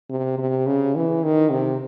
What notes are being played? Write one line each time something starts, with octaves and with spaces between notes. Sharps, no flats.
C3
C3
C#3
E3
D#3
C3